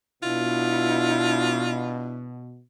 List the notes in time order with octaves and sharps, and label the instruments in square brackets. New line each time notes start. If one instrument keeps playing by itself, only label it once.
[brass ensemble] B2 [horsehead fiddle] D4 E4 [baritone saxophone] F4